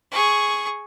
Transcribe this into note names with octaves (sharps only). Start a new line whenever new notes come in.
G#4 C#6